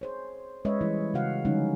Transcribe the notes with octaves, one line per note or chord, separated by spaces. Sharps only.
G#4 C5 C#5
G#3 C#4 B4 C#5 D#5 E5
E3 G3 E4
C#3 E4 F#4 F5 F#5
D3 F3 G3 G#3 C#4 D#4